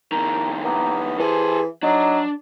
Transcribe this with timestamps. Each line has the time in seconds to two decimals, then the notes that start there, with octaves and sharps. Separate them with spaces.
0.12 F2 D#3 A#4
0.64 A#3 B3
1.20 E3 G#4 A4 C5
1.83 F#3 D4 D#4